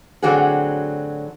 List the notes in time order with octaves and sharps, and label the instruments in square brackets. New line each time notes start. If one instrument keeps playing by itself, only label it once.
[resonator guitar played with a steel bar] A2 D3 F#3 C4 F#4 G#4